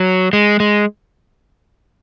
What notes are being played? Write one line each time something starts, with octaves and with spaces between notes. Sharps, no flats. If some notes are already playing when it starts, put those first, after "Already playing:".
Already playing: F#3
G#3
G#3